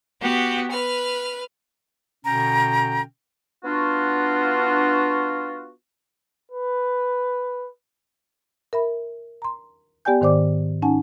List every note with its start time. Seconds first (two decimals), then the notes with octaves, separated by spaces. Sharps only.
0.21 B3 F#4 G4
0.71 B4 F6
2.25 B2 D3 C#4 G5 A#5
3.65 B3 D4 F4 F#4
6.51 B4
8.73 A#4 E5 B5
9.42 A#5 C6
10.05 B3 G4 D5 G5 G#5 G6
10.21 G#2 D#3 C5 D5 D6
10.82 C#4 D#4 F#5 G#5 A5